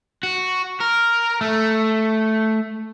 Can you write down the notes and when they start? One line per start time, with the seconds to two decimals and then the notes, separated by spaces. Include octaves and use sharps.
0.23 F#4
0.80 A#4
1.41 A3